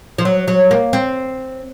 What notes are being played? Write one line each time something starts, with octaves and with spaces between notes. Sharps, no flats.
F3
F#3
F#3
A#3
C4